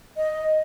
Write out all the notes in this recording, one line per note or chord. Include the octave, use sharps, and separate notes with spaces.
D#5